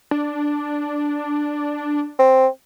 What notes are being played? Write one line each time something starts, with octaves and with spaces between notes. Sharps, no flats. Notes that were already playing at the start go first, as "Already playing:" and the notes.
D4
C4